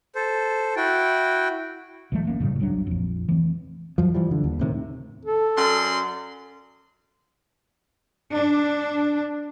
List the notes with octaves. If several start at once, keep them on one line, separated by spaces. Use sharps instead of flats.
A4 C5
E4 F#4 G5
B1 E3 G#3 A3
F#1 A#3 C#4
F#2 A2 C#3 G3
G1 C2 F#3 D4
A#1 F2
E3 A3 C4
F#2 F3
E3 F3 G3
D3
D#2
A2 C3 D#3
A4
F#2 D5 C6
D4